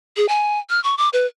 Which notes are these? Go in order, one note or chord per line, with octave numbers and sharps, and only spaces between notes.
G#4
G#5
F6
C#6
D6
B4